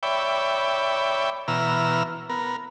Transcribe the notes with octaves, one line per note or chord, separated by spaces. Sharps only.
C#5 D5 E5 G5 B5
B2 E3 A#5 E6 F6
B3 A#4